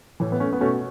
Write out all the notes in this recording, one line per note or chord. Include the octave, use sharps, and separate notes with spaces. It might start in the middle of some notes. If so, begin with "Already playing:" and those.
A2 E3
B3
A3 C#4
B3
B2 A3 C#4